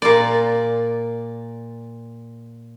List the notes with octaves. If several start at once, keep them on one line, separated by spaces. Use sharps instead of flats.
A#2 D5